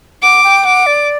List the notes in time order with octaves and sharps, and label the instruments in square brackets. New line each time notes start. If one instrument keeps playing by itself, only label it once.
[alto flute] F#5 [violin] D6
[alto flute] G5
[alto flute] F#5 [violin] D6
[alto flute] D5